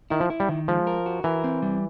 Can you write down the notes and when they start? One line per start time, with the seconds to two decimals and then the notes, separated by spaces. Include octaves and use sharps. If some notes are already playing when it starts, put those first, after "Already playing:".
0.10 D#3 E4
0.20 F3
0.30 E4
0.40 G3
0.49 D#3
0.68 F3 G#3
0.87 A#4
1.06 F#4
1.24 E3 A#4
1.44 C4
1.62 G3